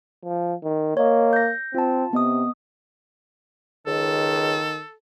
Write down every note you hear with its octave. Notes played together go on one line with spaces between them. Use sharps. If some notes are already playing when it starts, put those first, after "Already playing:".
F3
D#3
A#3 C#5 D#5
G6 A#6
C4 F4 A5
C3 B3 D#5 D#6
C#2 D#3 A4